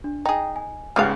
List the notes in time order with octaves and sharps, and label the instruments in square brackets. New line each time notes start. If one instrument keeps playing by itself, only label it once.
[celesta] D4
[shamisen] D#4 G#4 [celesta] G5
[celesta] G#5
[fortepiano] C#2 G#2 C#3 [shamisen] G3 B3 F5